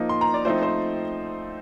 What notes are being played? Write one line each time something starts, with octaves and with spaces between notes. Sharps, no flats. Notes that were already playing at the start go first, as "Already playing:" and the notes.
Already playing: F3 A#3 D#4
C6
A#5
D5
F3 A3 C4 D#4 C5
C5